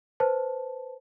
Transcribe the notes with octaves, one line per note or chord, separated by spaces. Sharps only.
B4 C5 A5